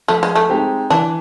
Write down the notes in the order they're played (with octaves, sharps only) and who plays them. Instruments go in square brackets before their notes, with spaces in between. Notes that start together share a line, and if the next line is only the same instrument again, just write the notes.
[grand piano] F3 [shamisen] A3
[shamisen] G#3
A3
[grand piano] G#3 C4 D#4 G4
[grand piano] E3 [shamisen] D4